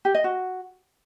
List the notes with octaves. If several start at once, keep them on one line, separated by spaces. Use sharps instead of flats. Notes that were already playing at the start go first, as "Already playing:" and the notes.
G4
D#5
F#4